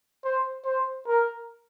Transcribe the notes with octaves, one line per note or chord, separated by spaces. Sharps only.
C5
C5
A#4